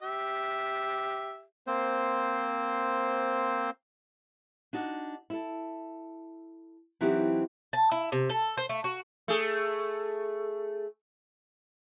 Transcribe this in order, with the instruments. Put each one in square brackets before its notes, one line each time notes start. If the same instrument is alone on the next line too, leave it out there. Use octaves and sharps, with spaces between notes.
[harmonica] G4 E5
[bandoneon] A#3 C4 C5
[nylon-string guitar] D4 D#4 F#4
E4 A4
E3 F#3 C4 D#4 E4 G4
[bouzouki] A5
E4
C3
A4
C5
A3
F#4
[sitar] A3 G#4